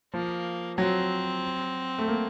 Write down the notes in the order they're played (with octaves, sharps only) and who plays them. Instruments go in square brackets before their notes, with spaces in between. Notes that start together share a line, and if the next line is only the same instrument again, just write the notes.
[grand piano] F3 [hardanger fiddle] A#3
[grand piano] F#3 [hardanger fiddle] C4
[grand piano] A3
A#3